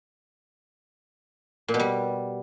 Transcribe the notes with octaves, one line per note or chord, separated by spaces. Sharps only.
A#2
B2
G3